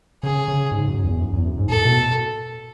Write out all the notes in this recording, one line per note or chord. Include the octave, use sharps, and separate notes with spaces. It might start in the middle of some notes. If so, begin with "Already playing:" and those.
C#3 G#4
C#3
G#2
F#2
E2
F#2
E2
F#2
G#2
A2 A4
B2